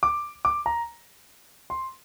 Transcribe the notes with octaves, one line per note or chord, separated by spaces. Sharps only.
D6
D6
A#5
C6